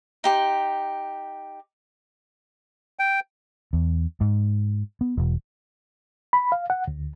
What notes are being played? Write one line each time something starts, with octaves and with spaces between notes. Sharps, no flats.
D#4 G4 C6
G5
E2
G#2
B3
E1
B5
F5
F#5
D2